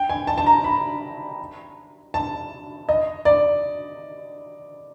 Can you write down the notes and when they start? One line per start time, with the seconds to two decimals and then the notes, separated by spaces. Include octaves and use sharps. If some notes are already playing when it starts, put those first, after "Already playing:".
Already playing: G5
0.09 G#5
0.27 A5
0.38 A5
0.46 A#5
0.64 B5
2.14 A5
2.89 D#5
3.25 D5